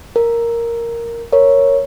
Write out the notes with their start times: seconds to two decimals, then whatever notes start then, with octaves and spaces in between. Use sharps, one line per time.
0.16 A#4
1.33 A#4 C#5